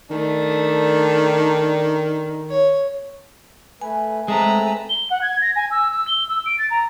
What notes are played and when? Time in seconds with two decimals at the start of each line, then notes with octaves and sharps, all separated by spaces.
0.11 D#3 A3 D4
2.50 C#5
3.81 A3 B4 G#5
4.28 G#3 A3 C4 B4 A5 A#5
4.89 G7
5.10 F#5
5.22 G#6
5.42 A#6
5.56 G#5
5.71 E6
5.91 E6
6.08 G7
6.29 E6
6.46 D7
6.58 A6
6.70 A#5